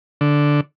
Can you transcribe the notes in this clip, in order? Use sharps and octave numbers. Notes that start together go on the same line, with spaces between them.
D3